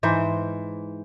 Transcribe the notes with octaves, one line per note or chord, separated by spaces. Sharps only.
G#2 E3 C5